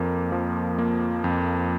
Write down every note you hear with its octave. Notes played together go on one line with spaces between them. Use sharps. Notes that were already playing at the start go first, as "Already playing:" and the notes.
Already playing: F2 A#3
F3
A#3
F2